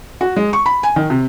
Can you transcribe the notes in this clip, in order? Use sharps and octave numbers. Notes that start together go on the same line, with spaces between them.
F#4
G#3
C#6
B5
G#5
D#3
C3